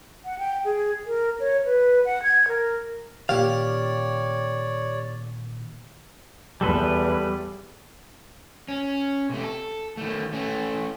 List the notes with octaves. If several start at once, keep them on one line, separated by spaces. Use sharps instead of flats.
F#5
G5
G#4
A#4
C#5
B4
F#5
G#6
A#4
A#2 D#3 G4 C#5 D5 F5
E2 G3 A4 B4
C#4
C3 A3
A4
D#3 A3
A3 C#4